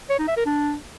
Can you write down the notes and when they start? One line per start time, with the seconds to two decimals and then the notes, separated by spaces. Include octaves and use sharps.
0.10 C#5
0.19 D#4
0.28 E5
0.37 A#4
0.46 D4